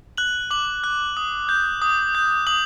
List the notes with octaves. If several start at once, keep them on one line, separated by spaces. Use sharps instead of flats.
F#6 F#7
D6 F#7
F#6
D#6
G6
D#6
G6
D#6 F#7